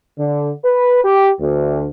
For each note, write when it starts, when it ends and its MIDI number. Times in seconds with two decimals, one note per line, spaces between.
0.18 0.51 50
0.65 1.01 71
1.04 1.30 67
1.40 1.87 38